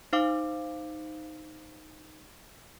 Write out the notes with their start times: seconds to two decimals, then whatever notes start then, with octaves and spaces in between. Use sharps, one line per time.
0.13 D#4 C5 F5 D6